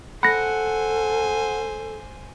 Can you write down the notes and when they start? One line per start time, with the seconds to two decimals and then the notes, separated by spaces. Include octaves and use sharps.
0.23 A4 C5 F#5 G#5 B5 A#6